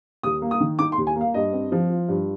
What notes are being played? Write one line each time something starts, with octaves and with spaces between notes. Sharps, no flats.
D#2 D#6
A#3
D#6
D#3
D#4 D6
C6
D#2
G#5
A#3
F5
G2 D#5
C4
F3
F4
G2